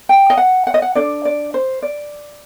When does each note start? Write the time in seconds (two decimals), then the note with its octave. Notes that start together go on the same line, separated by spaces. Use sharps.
0.09 G5
0.30 D#5
0.37 F#5
0.67 F#5
0.74 D#5
0.82 F#5
0.95 D4 A4 D5
1.25 D5
1.54 C5
1.82 D5